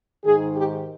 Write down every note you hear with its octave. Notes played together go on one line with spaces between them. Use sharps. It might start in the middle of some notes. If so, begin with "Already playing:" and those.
G#2 D#3 G#4
G4